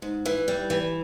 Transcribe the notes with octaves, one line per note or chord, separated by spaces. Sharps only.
G#2
E3
G3
E3